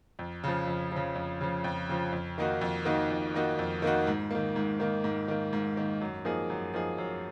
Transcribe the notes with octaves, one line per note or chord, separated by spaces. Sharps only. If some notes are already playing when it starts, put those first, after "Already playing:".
F2
C#3 F3
F2
C#3 F3
F2
C#3 F3
F2
C#3 F3
F2
D#3 A#3 D#4 F#4
F2
D#3 A#3 D#4 F#4
F2
D#3 A#3 D#4 F#4
F2
D#3 A#3 D#4 F#4
G#2
D#3 A#3
G#2
D#3 A#3
G#2
D#3 A#3
G#2
D#3 A#3
F#2
F3 A#3 D#4 G#4
F#2
F3 A#3 D#4 G#4
F#2